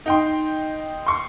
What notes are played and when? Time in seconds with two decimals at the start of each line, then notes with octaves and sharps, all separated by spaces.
0.06 D#4 G5 C6
1.06 C6 C#6